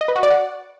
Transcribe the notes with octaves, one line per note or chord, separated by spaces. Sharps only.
D#5
B4
F#4
D5
F#5